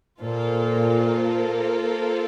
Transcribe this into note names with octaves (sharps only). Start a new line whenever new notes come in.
A#2 A#3 F4 A4 C5